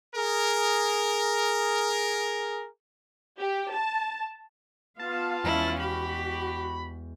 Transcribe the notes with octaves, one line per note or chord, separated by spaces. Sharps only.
G#4 A#4
G4
A5
B3 F4 F5 A5
E2 G#3 C#4 E4 F6
F#4 G4 B5